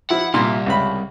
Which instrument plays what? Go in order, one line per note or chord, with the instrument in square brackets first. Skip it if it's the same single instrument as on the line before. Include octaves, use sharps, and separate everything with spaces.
[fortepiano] F3 E4 [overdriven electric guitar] F#5
[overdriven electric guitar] C2 [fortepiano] A#2 C6
[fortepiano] C#2 B5